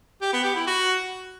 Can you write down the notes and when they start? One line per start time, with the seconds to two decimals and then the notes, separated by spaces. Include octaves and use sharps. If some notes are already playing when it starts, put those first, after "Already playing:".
0.21 G4
0.33 B3
0.44 G4
0.55 E4
0.67 F#4